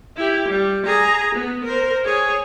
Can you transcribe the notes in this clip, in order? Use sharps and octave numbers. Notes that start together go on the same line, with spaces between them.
E4 G4
G3
G#4 A#5
B3
A#4 C5
G#4 C#5